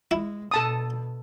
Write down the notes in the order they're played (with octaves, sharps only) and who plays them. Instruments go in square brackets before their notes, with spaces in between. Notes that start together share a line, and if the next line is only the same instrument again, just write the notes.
[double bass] G#3 [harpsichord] E4
[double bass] B2 [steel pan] A4 A5 D#6